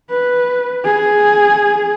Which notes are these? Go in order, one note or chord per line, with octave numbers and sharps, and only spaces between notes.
B4
G#4